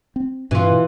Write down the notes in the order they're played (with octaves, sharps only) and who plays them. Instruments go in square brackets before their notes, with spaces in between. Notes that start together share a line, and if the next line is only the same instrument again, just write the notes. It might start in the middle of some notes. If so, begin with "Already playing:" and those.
[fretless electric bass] C4
[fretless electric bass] G2 B2 C4 [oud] E3 F4
[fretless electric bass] B2